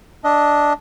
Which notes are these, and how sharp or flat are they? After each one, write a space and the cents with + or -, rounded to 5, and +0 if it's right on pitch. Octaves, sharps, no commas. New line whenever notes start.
D4 +0 D#5 +15